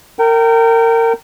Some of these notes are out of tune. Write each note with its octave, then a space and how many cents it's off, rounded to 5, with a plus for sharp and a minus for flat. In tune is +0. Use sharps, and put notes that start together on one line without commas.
A#4 -25 G5 -25